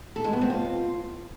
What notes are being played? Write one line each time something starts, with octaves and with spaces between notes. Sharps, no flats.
A4
G#3
B3
C4
F4